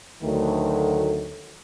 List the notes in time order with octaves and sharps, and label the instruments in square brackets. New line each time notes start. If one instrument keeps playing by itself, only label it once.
[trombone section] D2 D3 D#3 F#3 A3